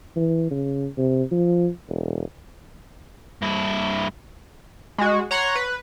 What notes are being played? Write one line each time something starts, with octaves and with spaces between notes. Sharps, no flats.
E3
C#3
C3
F3
E1
G2 E4
G#3 F#4
C#5 F#5 A#5 C6
B4